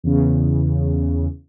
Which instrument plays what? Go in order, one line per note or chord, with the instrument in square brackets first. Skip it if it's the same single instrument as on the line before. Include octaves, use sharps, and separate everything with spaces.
[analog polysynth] E2 C#3